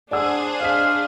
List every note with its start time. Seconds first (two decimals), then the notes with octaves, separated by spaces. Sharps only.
0.11 D4 G#4 C5 D5 F#5 E6
0.61 D5 D#5 F5 B6